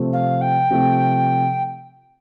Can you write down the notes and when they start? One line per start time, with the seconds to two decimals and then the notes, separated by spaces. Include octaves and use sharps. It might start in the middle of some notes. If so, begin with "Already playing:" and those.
Already playing: C3 F3 A3 C4
0.12 F5
0.41 G5
0.70 C3 F3 A3 C4